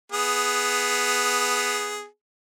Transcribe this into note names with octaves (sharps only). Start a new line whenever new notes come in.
B3 G#4